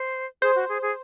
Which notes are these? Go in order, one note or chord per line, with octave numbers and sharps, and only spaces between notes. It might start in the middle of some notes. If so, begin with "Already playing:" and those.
Already playing: C5
G#4 C5
F#4
G#4
G#4